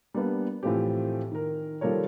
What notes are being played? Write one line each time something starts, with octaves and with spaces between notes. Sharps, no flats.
G3 A#3 B3 D4
A2 E3 F3 A3 C4 G4
D#3 A#4
D#3 F3 G3 A4 A#4 C#5